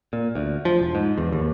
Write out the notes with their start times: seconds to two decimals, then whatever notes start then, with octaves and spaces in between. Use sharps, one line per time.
0.13 A#2
0.35 D2
0.65 F3
0.79 E1
0.95 G#2
1.18 E2
1.32 D#2